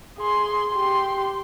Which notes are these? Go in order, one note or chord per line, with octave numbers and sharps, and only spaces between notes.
G#4 C6
G4 C6